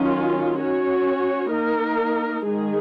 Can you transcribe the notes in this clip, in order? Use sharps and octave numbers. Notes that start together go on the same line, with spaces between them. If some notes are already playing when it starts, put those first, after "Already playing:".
Already playing: D#3 F#3 C#4 F4
C#4 F#4 C#5
A#3 D#4 A#4
D#3 G#3 D#4 G#4